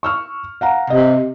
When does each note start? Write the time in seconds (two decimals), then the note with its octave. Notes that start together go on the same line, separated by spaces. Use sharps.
0.03 C#6 E6 F6
0.61 F5 F#5 A#5
0.90 C3 D#5